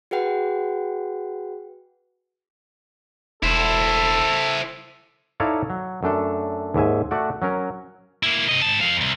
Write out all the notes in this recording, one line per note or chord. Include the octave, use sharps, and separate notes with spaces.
F#4 G#4 B4 F#5 G5
E1 E4 A4 C5
D#4 E4 A4 C#5 D5 F5
F#3
F#2 A3 D4 A4
D#2 G#2 E5 G#5
A3 F#4 D5 F#5
F#3 C#4 A#4
A#3 E4
C3 D#5
G#2 A5
F2 F5
C2